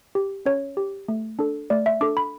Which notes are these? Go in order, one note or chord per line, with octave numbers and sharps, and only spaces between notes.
G4
C#4 C#5
G4
A3
D4 A4
A3 D5
E5
D4 A4 D6
B5